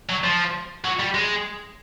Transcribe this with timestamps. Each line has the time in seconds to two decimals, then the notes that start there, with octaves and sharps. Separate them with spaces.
0.09 F#3
0.24 F3
0.85 F#3
1.00 G3
1.15 G#3